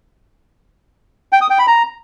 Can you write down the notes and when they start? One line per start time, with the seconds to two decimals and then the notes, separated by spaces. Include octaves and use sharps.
1.33 G5
1.41 D#6
1.50 G5
1.59 B5
1.67 A#5